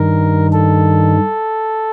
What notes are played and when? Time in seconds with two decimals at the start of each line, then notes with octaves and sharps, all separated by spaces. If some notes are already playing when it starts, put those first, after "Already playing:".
Already playing: G2 D#3 A#4
0.53 A4